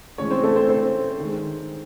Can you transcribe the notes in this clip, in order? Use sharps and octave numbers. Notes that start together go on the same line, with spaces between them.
A2 E3 G#3 C#4 C#5
C4 C5
A3 A4
C4 C5
C4 C5
D#3 G#3